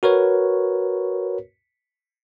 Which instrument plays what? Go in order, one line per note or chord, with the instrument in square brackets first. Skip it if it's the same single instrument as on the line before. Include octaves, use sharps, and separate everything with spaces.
[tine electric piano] F#4 A#4 B4 C#5